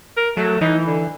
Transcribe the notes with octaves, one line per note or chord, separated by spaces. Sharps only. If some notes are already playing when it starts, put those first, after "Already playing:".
A#4
F#3 A3
E3 D#4
D3